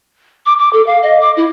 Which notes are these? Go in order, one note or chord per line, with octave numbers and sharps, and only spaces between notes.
D6
D6
A4
F5
D#5
D6
E4